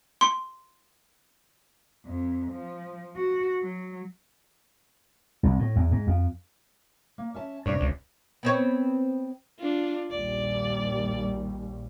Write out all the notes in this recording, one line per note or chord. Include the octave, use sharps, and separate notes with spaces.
C6
F2
F3
F#4
F#3
C2
A2
E2
G#2
F2
A#3
C#4 E5 A5
G2 C3 D4 C#5
C#2
B3 C4 C#5
D4 F4
A#1 D#2 G3 D5